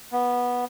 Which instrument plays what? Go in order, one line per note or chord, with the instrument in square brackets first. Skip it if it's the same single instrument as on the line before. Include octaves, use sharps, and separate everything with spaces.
[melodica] B3